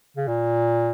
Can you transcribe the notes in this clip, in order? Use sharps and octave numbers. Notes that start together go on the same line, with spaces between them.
C#3
A#2